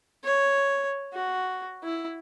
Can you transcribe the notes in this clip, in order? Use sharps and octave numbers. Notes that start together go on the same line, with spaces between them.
C#5
F#4
E4